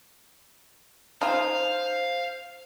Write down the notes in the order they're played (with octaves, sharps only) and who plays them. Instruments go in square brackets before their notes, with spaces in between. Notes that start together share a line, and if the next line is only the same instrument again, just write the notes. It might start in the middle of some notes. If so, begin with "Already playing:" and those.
[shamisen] D#4 F4 [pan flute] C5 [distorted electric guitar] F5